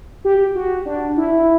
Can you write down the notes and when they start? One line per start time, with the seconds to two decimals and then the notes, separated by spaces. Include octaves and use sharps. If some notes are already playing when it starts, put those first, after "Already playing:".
0.25 G4
0.55 F#4
0.86 D4
1.17 E4